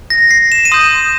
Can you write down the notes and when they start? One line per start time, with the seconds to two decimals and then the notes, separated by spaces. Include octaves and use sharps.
0.10 A#6
0.31 C7
0.52 E7
0.65 D#7
0.71 C6 D#6 G6 E7